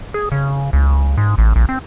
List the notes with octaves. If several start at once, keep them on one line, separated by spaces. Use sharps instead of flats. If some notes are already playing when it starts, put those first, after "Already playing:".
G#4
C#3
C#2
G#2
A1
A#1
C4